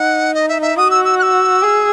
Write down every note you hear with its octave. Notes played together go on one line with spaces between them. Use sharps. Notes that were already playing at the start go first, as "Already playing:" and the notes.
Already playing: D#4 F#5
D#5
E5
E5
F#4 D#6
E6
E6
F#6
E6
G#4